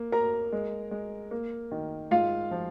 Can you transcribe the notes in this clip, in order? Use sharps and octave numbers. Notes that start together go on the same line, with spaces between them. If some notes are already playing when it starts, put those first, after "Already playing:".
Already playing: A#3
A#3 A#4 A#5
G#3
G#3
A#3
D#3
G#2 F4 F5
F3